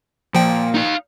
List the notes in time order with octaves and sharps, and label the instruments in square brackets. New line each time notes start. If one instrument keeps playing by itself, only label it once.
[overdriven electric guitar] A#2 [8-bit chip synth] F3 G5
[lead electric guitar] D#4 F5